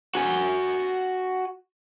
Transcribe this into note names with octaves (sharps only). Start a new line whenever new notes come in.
F#4 G#5